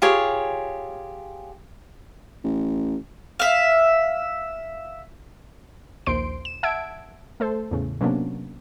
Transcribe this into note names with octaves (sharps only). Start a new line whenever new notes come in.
F4 G4 G#4 C#5
A1
E5 F5
A#1 D#2 C5 C6 D7
E7
E5 F#5 A5 E6 G#6 D7
A3 A4 C5
E2 A2 C#3
C3 F#3 A#3 B3 C#4 D4